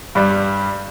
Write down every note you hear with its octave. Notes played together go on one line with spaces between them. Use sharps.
G2 G3